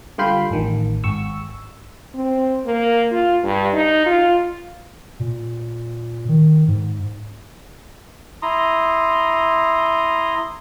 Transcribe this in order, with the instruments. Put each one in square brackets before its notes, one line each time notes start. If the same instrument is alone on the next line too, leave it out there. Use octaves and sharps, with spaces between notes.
[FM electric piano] D3 G3 F4 G5 B5 C7
A1 D#3
G#1 C#6 E6
[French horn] C4
A#3
F4
G2
D#4
F4
[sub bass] A#2
D#3
G#2
[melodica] E4 A#5 C6 D#6